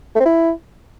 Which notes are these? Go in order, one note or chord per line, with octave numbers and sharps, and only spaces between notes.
A3
C4
E4